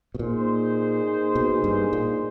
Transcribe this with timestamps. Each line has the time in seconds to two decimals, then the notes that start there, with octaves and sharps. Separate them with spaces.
0.15 B2
0.19 A#2 A#3 D#4 G#4 C5
1.35 B2
1.64 G2
1.93 A#2